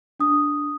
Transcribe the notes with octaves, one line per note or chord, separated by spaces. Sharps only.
D4 D#6